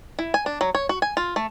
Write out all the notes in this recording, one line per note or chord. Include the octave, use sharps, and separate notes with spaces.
E4
G#5
D4
F#3
C#5
F#4
G#5
F4
A3